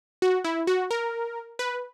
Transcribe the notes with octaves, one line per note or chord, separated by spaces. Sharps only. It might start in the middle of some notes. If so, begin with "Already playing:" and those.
F#4
E4
F#4
A#4
B4